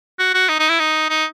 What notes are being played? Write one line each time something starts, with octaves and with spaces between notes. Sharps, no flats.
F#4
F#4
D#4
D#4
E4
D#4
D#4